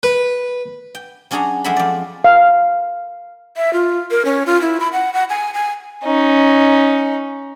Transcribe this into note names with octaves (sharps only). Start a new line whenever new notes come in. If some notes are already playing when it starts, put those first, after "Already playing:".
B4
G5
F#3 C#4 D4 G#4 F#5 A#5
F2 F#3 G#3 E5 F#5 B5
F2 D5
F5
E5
F4
A#4
C#4
F4
E4
B5
F#5
F#5
G#5
G#5
C#4 D#4